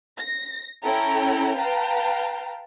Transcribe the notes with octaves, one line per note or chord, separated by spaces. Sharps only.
A#6
C#4 E4 A4 G5 A#5
B4 F5 G5 A5 A#5